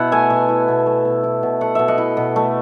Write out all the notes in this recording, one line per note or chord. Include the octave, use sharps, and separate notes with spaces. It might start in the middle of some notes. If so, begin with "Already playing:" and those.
Already playing: B2 E4 F#5
A3 E5 G#5
B2
E4
B2
A3
B2
E4
B2
A3 F#5
B2 E5
D#5 F#5
E4
B2
A3